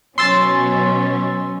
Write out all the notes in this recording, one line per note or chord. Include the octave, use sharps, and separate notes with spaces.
B2 F#3 C#4 C6 E6 A6